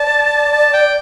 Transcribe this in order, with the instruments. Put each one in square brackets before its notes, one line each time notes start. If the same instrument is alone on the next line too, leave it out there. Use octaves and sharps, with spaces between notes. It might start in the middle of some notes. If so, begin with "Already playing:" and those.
Already playing: [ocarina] D5 [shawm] A5
[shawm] A5
G5